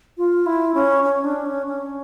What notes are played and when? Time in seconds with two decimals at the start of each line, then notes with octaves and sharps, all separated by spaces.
0.17 F4
0.46 E4
0.74 C#4
1.03 C#4
1.24 D4
1.46 C#4
1.67 C#4